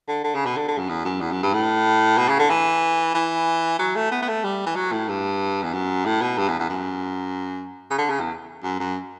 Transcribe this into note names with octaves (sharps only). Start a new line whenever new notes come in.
D3
D3
C#3
B2
D3
D3
F#2
E2
F#2
E2
F#2
G2
A2
B2
C#3
D3
E3
E3
F#3
A3
B3
B3
A3
G3
E3
F#3
A2
G2
E2
F#2
A2
B2
G2
E2
E2
F#2
C#3
D3
C#3
E2
F#2
F#2